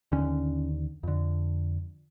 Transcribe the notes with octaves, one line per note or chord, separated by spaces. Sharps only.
D#2 D3 C#4
F2 D3